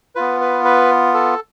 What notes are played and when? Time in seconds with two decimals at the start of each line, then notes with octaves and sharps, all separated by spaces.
0.15 B3 F4 B4
0.40 B4
0.65 B4
1.14 A4